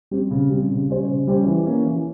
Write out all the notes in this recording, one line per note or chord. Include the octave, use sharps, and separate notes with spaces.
G3 C4 G4
C#3
G3 C4 G4
C#3
G3 C#4 G4 C5
C#3
G3 C#4 G4 C5
E3
A#3 C#4
E3